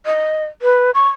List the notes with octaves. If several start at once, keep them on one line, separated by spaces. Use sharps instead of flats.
D#5
B4
C#6